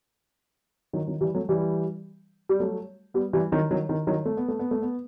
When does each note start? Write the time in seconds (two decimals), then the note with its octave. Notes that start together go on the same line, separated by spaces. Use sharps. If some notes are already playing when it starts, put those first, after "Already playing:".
0.93 D#3 F#3
1.07 D#3 F#3
1.21 E3 G3
1.34 F#3 A3
1.49 E3 G3
2.49 G3
2.60 F#3 A3
3.14 G3 B3
3.33 E3 G3
3.52 D#3 F#3
3.71 D#3 F#3
3.89 D#3
4.07 D#3 F#3
4.25 A3
4.37 B3
4.48 A3
4.59 B3
4.71 A3
4.82 B3